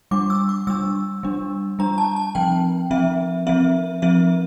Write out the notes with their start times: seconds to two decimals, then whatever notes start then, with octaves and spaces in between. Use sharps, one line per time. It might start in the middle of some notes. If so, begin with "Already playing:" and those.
0.11 G3 D4 D6
0.30 E6
0.49 D6
0.67 G3 D4 E6
1.23 G3 D4
1.79 G3 D4 A#5
1.98 A5
2.16 A5
2.35 F3 C4 G5
2.91 F3 C4 E5
3.47 F3 C4 E5
4.02 F3 C4 E5